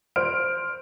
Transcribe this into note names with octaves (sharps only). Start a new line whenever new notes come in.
C5 F6 D7